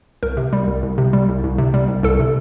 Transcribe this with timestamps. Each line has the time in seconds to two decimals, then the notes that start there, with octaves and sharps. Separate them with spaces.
0.23 C2 A#4
0.37 C3
0.53 G3
0.67 C2
0.83 C2
0.98 C3
1.13 G3
1.28 C2
1.44 C2
1.58 C3
1.74 G3
1.88 C2
2.03 C2 A4
2.20 C3